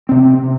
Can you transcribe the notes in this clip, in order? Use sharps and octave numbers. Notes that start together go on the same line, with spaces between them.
C3 C4